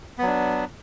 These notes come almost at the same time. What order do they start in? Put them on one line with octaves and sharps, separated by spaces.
B3 F#3 D4